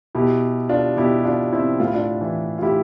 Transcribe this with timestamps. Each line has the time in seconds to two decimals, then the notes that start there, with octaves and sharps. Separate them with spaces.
0.15 B2 E4 G4
0.69 D4 F4
0.97 B2 E4 G4
1.25 D4 F4
1.53 C4 E4
1.80 A2 F4
1.87 E4
1.94 D4 F4
2.21 E3
2.58 F4
2.62 A2 E4 G4